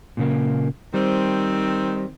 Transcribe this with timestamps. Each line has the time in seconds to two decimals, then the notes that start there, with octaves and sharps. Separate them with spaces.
0.17 A#2 C#3 A#3
0.94 D#3 G3 C4